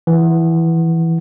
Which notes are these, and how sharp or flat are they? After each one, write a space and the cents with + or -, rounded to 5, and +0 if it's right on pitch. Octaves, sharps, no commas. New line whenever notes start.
E3 +0 F#5 +0